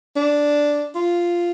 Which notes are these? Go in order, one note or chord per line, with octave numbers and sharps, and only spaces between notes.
D4
F4